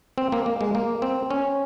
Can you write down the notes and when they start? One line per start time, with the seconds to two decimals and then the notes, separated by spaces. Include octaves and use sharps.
0.18 C4
0.32 A#3
0.46 A#3
0.61 G#3
0.75 A#3
1.02 C4
1.30 C#4